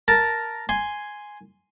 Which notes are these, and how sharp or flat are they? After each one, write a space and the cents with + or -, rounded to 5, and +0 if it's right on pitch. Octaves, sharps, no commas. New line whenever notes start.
A#4 +0 A5 +0
G#5 +0 C6 +0